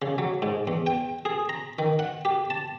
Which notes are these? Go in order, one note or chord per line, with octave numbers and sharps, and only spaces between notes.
C#3
F#3
G#2
E2
G5
G#4
A#5
D#3
F#5
G4
A5